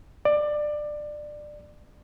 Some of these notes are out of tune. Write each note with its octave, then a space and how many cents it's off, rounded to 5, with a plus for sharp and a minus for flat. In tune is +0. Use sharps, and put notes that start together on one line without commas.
D5 +20